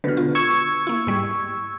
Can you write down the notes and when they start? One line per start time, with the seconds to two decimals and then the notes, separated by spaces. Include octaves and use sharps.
0.04 B2 D3 B4 F6
0.17 F4
0.35 C#6 E6 G#6
0.87 A#3 E4
1.07 G#2 G3